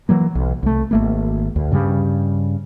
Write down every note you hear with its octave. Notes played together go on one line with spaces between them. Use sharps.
E3 F#3 A#3
B1
C2 A3
G#1 A3 A#3
D2
G2 C#3 G3